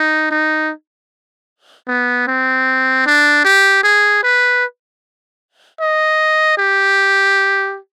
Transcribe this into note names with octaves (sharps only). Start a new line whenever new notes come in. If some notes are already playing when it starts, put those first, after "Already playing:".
Already playing: D#4
D#4
B3
C4
D4
G4
G#4
B4
D#5
G4